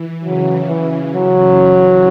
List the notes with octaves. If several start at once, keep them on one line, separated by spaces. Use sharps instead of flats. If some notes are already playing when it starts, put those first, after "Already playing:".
Already playing: E3
C#3 F#3
E3
F#3